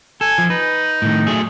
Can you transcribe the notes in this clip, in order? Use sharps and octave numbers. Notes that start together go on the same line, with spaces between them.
A4 G#5
F3
D#4 B4
A2 D#3
F#3 A3 G#4